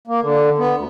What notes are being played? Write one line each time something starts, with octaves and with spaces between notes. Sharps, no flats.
A#3
D3
B3
D2